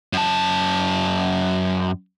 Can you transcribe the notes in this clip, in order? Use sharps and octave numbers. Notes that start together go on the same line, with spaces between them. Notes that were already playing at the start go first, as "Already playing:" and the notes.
F#2 A5